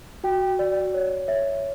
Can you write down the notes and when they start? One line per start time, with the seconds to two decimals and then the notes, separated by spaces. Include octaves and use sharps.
0.24 F#4 G5
0.59 F#4 D5
0.94 C#5
1.28 C#5 E5